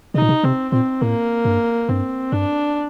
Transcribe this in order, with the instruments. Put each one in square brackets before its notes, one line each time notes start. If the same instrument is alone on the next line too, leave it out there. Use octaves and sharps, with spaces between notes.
[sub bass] C3 [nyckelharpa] D#4
[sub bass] A#2
C3
[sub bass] C3 [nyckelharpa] C4
[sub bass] A#2 [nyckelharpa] C4
[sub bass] A2 [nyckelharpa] A#3
[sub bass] G2
[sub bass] G2 [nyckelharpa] C4
[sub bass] G2 [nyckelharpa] D4